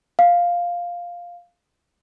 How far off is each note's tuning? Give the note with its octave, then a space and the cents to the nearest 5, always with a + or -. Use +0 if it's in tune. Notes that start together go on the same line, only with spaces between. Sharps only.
F5 +0